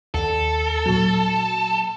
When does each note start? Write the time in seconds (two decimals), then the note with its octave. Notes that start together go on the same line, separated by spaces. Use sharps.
0.14 D#2 A4
0.86 A#2 F#3